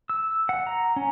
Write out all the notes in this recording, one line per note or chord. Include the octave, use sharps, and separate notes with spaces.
E6
F#5
A#5
C#4